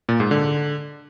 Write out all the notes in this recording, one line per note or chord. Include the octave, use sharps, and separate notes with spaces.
A#2
G#2
D3